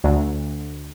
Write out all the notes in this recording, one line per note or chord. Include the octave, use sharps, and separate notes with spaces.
D2